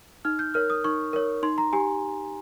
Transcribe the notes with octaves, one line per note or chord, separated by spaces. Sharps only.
D#4 F6
G6
A#4 C#5 F6
D#6
D#4 C#6
A#4 C#5
D#4 C6
A#5
G4 G#5